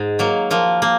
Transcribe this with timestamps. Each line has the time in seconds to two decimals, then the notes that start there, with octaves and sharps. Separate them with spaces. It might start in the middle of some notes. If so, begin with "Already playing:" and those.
Already playing: G#2 G#4
0.19 F#3 A#3
0.51 F3 A#3
0.82 A#3